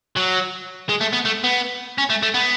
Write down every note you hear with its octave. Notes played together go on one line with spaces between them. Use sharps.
F#3
G#3
A3
B3
A3
B3
C#4
A3
A3
B3